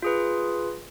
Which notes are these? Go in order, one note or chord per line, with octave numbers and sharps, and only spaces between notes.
F4 G#4 B4